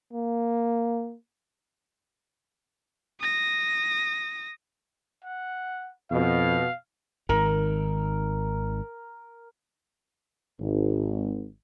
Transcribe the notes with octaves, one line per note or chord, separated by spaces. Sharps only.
A#3
D#6 A#6
F#5
F2 B2 F5
G#1 D#3 A#4
G#1